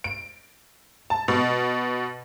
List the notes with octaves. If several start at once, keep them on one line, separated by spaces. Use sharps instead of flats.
D7
A5
B2